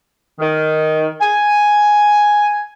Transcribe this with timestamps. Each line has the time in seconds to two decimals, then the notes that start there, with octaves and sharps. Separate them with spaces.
0.39 D#3
1.21 G#5